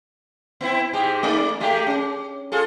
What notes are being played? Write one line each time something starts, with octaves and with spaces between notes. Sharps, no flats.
B3 C4 E4
G#2 G#3 G4
A3 D#4 D5
G#3 A3 G4
C#4
F4 G#4 A4